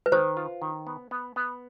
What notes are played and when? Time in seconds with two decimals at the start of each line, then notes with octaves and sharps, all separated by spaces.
0.06 B4
0.12 D#3 C5
0.37 F4
0.62 D#3
0.87 B3
1.11 B3
1.36 B3